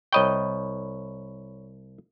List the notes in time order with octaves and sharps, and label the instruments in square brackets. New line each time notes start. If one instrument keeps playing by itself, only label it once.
[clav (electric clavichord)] C2 D#5 G5 [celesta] C#5 B5 C#6